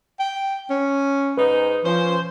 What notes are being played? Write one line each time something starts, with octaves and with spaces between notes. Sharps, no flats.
G5
C#4
G#2 D#4 B4
F3 C#4 C5